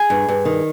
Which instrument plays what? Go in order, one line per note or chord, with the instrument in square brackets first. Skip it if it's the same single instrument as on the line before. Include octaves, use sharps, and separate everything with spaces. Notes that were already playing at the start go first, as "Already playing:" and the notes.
Already playing: [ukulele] G#4
[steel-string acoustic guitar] G2
G2
D#3